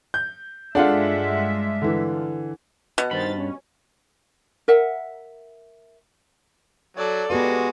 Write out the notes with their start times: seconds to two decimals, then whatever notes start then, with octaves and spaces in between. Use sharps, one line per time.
0.14 G6
0.75 G2 G#3 D4 F4 G#4 A4 E5 F#5
1.82 D3 E3
2.98 B2
3.11 G2 D#3 C5 B5 A6
3.37 C#4
4.68 A#4 E5 F#5
6.97 F#3 A4 D5
7.30 G#3 B3 F#4 G4 B4